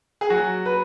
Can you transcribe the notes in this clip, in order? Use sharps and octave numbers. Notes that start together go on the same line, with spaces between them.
G#4
F#3 F#4
B4